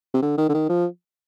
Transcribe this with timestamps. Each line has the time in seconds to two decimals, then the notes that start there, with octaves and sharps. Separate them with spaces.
0.14 C3
0.22 D3
0.38 D#3
0.49 D3
0.54 D#3
0.69 F3